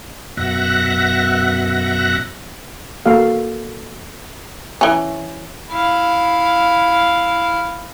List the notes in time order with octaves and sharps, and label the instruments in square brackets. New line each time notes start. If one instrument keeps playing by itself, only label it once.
[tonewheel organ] F#2 B2 E5 F#5 F#6 A#6
[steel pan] A#3 F#4 A4 F5
[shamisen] E3 C#4
[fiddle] E4 F5